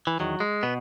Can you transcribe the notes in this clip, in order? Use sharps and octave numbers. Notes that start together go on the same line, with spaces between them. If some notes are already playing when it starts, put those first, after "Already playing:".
E3
E2 D#3 F#3
G#3
B2 B3